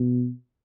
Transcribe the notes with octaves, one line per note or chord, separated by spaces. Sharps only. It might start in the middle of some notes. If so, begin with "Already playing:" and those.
Already playing: B2